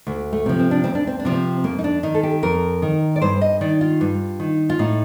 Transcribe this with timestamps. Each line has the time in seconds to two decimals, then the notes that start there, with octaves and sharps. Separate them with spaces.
0.07 D2
0.33 A3
0.46 C3 F3
0.59 C4
0.71 D4
0.84 D2 C4
0.95 D4
1.07 C4
1.19 D4
1.25 C3 F3
1.32 C4
1.64 F2 A#3
1.79 D#4
1.84 D4
2.03 D#3 D#4
2.14 A4
2.23 G4
2.43 F2 A#4
2.82 D#3
3.16 D5
3.22 G2 C5
3.41 D#5
3.61 D#3 D5
3.81 F4
4.01 G2
4.40 D#3
4.70 F4
4.79 A2 D#4